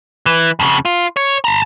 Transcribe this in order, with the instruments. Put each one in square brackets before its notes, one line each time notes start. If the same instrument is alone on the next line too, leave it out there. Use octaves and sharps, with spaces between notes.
[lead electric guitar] E3
F2 C#3
F4
C#5
A5 A#5